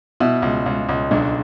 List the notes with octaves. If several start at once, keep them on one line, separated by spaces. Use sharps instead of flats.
B2 E4
C#2
C#2
C#2
B1 D4